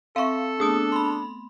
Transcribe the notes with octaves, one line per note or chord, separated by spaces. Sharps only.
C4 A4 E5 F5 C#6
A3 B3 D4 G#4 D#6
B5 C6